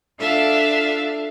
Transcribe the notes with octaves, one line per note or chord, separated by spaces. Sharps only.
D4 F4 A4 E5 F5